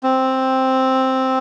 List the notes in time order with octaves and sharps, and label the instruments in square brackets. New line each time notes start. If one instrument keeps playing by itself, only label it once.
[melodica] C4